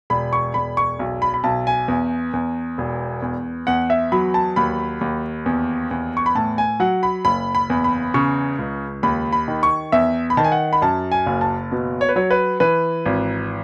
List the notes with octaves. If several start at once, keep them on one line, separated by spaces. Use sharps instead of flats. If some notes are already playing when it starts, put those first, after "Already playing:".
E1 B5
C#6
E1 B5
C#6
B1
B5
B5
B1 A5
G#5
E2
E2
E1
E2
E2 F#5
E5
F#3 B5
A5
D#2 B5
D#2
E2
E2
C#6
B5
A2 A5
G#5
F#3 F#5
B5
F#1 B5
B5
E2
B5
C#3 C#6
C#2
D#2 B5
B5
D#3
C#6
E2 E5
B5
D#3 A5
G#5
F#5
B5
F#2 A5
G#5
F#1
A5
B2
C#5
B4
F#3 C#5
B4
E3 B4
G#1